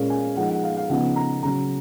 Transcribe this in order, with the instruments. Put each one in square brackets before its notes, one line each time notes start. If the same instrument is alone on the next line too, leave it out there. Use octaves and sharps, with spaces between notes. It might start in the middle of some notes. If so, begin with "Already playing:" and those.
Already playing: [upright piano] A#2 G#3 C#4 F5
G#5
F3 G#3 D#4 F#5
F#5
F5
F5
C#3 F3 B3 D#4 F#5
A#5
C#3 F#3 C#4 A#5